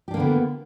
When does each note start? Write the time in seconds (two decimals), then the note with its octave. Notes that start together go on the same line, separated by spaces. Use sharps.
0.08 G4
0.11 D4
0.14 A#3
0.17 D3
0.20 B3